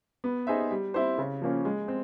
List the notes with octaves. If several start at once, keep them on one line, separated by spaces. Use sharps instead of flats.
B3
D#4 G#4 C5 E5
G3
C4 E4 G4 C5
C#3
F3 A#3 C#4
G#3
C4